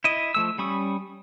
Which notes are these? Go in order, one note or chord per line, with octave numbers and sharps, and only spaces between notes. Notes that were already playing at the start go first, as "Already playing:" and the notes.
E4 D#5
F3 A3 E6
G3 C#4 B5 C#6 D#6